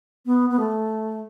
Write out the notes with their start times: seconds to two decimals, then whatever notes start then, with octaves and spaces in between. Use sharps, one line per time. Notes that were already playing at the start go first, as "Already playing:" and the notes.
0.26 B3
0.50 B3
0.59 A3